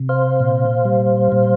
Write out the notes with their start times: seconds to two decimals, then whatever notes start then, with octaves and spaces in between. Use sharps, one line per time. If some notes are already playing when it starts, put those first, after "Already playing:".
Already playing: C3
0.09 C5 F5
0.40 A#2
0.85 G3
1.32 A#2